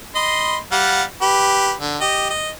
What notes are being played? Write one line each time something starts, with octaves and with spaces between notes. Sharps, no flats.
D#5 B5 C6
G3 F5 F#5
G4 B4
D3
G4 D#5
D#5